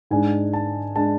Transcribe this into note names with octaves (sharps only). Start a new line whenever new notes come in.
G#2 G#3 D4 G#5
A5
G#3 D4 A5